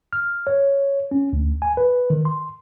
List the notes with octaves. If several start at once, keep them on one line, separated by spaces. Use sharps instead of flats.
F6
C#5
C#4
D2
G#5
B4
D#3
C6